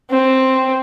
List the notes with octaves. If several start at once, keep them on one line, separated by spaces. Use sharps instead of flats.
C4